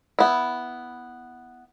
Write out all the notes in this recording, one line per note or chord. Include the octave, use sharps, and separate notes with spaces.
B3 E4